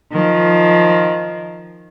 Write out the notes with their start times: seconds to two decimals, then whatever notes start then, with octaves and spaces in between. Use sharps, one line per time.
0.12 D#3 F3